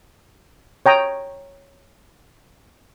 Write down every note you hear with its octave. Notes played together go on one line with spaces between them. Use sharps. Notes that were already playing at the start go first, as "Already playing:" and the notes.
C#5 G5 A#5 D#6